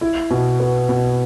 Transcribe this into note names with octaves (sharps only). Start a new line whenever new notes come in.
E4
B2
B3
B2